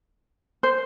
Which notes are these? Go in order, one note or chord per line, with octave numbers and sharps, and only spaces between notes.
C5